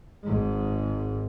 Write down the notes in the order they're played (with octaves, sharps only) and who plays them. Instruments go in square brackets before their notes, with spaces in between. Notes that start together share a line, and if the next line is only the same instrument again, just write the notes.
[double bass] G#1 G#2